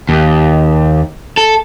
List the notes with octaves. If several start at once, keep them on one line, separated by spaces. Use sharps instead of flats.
D#2
A4